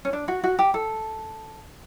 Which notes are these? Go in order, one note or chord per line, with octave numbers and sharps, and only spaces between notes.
C#4
D4
F#4
F#4
G4
A4